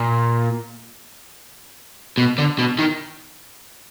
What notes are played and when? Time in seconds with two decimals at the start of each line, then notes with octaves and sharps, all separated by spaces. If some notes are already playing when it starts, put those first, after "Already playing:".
Already playing: A#2
2.18 B2
2.38 D3
2.58 B2
2.78 D#3